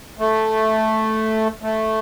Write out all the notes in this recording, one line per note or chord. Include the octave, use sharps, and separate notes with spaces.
A3
A3